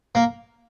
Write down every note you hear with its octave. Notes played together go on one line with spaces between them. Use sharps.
A#3